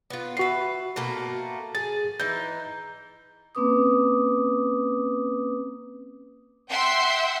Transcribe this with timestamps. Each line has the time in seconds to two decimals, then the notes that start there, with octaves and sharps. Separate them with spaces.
0.10 B3 F4
0.37 F#4 B4 E5 C7
0.96 B2 A3 A#3
1.75 G#4 A6
2.20 E3 D#4 G6
3.55 A#3 C4 C#4 B4 D6 D#6
6.70 E5 F#5 G5 C6